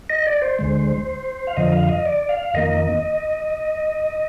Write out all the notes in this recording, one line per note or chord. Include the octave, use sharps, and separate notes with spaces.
D#5
D5
C5
D2 D3 G#3
F5
F2 D3 F3 D#5
F5
D#5
D5
F5
F2 D#3 A#3 D#5